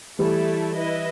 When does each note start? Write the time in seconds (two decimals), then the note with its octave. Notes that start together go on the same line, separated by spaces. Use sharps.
0.19 E3 G3 A3 E4 A4
0.76 E4 B4 D#5